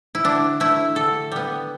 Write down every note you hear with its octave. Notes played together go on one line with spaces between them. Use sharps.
E4
D3 D4
A3 E4
D3 A4
G3 B3